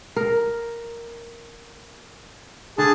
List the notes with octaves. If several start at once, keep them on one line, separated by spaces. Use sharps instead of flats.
A#4
D3 G#4 A5